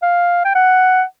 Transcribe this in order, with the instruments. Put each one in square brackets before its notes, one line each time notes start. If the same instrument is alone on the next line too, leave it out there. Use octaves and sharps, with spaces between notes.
[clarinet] F5
G5
F#5